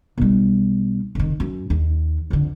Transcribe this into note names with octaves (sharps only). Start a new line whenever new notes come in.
B1 G3
F1 D#3
F#2
D#2
F2 D3